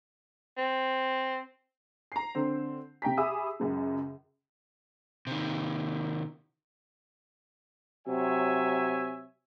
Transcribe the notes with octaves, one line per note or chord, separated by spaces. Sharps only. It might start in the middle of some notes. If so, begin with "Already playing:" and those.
C4
A#5 C7
D3 C4
C3 G5 A#5 B6
G4 G#4 E5 B5 D#6 E6
C#2 F#2 C#3
C3 D#3
C3 F#3 C#5 E5 G#5